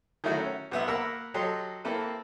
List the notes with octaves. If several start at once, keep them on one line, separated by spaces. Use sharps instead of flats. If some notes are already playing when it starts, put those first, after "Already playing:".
D#3 F#3 A3 E4 F#4
C#4
B1 B3 E5
A#3 A#4 F#5 B5 E6
F#3 G4 A4 D#5 C6
A#3 C4 E4 A4 B4